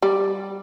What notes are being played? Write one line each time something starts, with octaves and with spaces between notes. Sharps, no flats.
G3